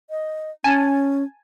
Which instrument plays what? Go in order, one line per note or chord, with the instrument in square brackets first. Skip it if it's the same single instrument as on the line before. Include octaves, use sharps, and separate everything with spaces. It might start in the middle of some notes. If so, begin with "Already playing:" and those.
[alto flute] D#5
[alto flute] C#4 [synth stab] G#5 A5